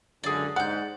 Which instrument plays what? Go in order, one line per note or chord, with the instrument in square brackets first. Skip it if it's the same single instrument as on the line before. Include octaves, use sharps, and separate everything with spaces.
[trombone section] C#2 F#2 D3 [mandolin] G#4 D5
[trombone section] G#2 [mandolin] D5 G6 [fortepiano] F#5